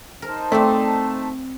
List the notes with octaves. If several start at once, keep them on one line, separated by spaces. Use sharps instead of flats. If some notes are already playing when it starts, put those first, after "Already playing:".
D#4 A#4 C5 A5
A3 C4 D5 E5